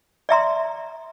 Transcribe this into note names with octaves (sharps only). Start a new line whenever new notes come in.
D5 E5 A#5 C6